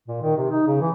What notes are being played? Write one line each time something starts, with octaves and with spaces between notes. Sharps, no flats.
A#2
D#3
C3
D#4
C#3
E3